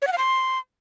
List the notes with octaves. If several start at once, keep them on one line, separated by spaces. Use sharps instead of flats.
C#5
F#5
F5
C6